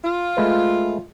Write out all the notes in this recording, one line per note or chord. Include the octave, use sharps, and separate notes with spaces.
F4
G#3 A3 B4